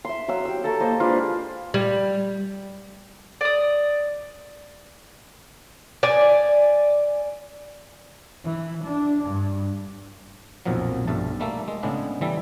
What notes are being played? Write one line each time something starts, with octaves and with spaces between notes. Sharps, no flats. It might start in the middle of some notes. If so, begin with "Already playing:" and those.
E5 C6
F#3 F5 C6 E6
G4 E6
A4 A#4 A5 C#6
A#3 C5 D#5
G#3 D4 F4 B4
G3
D5 D#6
D5 G#5
E3
D4
G2
B1 F2 A#2 F3 F#3
B1 G2 A3 A5
G3 A3 A#3 A4
G#3
A2 C#3 G#3 B3 D4
E3 G3 A4